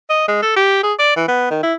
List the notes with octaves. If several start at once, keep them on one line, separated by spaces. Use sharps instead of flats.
D#5
G#3
A4
G4
G#4
D5
E3
B3
D#3
E4